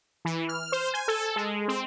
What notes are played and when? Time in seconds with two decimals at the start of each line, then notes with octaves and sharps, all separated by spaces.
0.25 E3
0.49 F6
0.72 C5
0.94 G#5
1.08 A4
1.36 G#3
1.68 C4